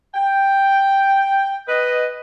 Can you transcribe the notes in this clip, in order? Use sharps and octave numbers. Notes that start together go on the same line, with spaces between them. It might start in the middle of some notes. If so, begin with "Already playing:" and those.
G5
B4 D#5